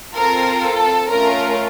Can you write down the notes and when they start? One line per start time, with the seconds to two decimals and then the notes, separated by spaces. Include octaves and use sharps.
0.14 C4 F4 A4 A#4
0.62 A4
1.09 A3 C#4 F4 A#4